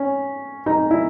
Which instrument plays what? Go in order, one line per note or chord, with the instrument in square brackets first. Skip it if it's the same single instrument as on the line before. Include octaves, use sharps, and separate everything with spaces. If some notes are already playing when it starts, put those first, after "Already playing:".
Already playing: [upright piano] C#4
D#4
E4